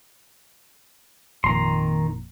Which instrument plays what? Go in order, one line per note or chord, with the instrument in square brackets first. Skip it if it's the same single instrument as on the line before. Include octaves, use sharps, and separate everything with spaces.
[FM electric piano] G#1 F2 A#2 [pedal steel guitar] D#3 A#5 C6